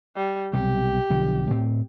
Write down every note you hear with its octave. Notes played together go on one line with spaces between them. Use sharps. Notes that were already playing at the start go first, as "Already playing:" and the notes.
G3
B1 C3 G3 G4
B1 D3 F3
A2 C4